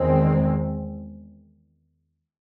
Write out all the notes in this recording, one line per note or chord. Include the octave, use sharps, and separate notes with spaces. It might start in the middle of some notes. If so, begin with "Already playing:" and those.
Already playing: E2 D#3 G#3 C4